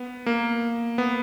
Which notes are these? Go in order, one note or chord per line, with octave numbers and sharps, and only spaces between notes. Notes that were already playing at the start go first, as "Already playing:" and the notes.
Already playing: B3
A#3
B3